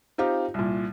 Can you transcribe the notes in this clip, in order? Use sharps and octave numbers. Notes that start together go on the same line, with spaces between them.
C4 D#4 F4 G4
C2 A#2